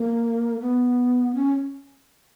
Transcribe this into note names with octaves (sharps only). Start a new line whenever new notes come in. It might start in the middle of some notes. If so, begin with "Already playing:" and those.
Already playing: A#3
B3
C#4